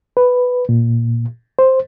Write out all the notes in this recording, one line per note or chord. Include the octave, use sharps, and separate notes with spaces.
B4
A#2
C5